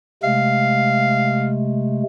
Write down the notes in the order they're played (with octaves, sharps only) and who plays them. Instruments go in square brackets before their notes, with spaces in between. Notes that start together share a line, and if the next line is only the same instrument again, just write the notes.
[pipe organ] C3 G#3 A3 [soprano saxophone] F5